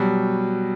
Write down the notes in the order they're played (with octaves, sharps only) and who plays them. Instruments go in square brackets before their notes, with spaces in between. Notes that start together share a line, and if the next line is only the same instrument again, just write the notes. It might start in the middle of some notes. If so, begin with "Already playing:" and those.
Already playing: [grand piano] B2 F#3 G3